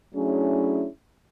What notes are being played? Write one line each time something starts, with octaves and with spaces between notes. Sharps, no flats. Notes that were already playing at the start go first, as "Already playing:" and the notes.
F#3 A3 C#4 D4 E4 G#4